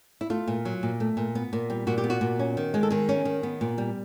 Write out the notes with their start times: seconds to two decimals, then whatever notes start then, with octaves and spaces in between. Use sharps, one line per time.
0.21 E4
0.30 A3 F4
0.48 A#2
0.65 F#3
0.83 A#2
1.00 A3
1.17 A#2
1.35 B3
1.53 A#2
1.70 G3
1.87 A#2 F#4
1.98 G4
2.04 B3
2.10 F#4
2.21 A#2
2.39 C#4
2.57 D#3
2.74 G#3
2.83 A4
2.91 D#3 G#4
3.09 C#4
3.25 D#3
3.43 B3
3.61 A#2
3.78 G3